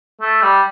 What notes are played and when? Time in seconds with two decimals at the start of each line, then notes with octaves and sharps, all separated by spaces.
0.21 A3
0.42 G3